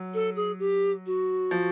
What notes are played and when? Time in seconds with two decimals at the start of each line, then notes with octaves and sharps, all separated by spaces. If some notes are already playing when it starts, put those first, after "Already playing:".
Already playing: F#3
0.14 A4
0.36 G#4
0.59 G4
1.06 F#4
1.51 F3